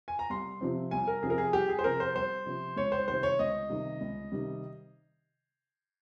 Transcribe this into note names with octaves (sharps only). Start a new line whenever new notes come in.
G#5
A#5
C2 C6
C3 F3 C4
C2 G#5
A#4
C3 F3 C4 G#4
A#4
G#4
C2 G4
G#4
C5
C3 F3 C4 A#4
C5
C2 C5
C3 F3 C4
C#2 C#5
C5
C3 D#3 G3 C5
C#5
C#2 D#5
C3 D#3 G3
C#2
C3 D#3 G3